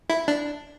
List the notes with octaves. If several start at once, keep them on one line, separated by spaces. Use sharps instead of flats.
E4
D4